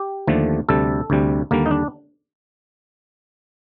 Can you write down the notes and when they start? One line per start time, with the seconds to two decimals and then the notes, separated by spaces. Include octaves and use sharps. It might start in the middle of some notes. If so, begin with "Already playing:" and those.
Already playing: G4
0.27 D#2 D3 F3 A3
0.69 D2 C3 G3 A4
1.10 D2 C3 G3
1.51 D#2 D3 G3 A#3
1.66 D#4
1.71 D4